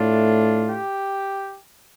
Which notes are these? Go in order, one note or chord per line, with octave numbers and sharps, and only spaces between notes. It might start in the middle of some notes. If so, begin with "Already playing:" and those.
Already playing: A2 A3 D4 F4
G4